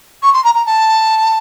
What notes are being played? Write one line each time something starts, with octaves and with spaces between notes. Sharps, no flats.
C#6
C6
A#5
A#5
A5